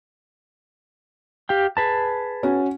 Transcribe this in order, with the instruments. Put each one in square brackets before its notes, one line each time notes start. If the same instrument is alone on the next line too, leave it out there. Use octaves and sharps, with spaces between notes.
[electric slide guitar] G4 F5 G5
G#4 B4 A5
[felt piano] C#4 F#4